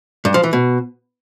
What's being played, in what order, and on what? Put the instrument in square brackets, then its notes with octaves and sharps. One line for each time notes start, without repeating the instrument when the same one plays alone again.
[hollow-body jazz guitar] G2
F3
E3
B2